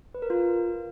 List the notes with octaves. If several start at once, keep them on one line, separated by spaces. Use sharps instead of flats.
B4
A#4
F4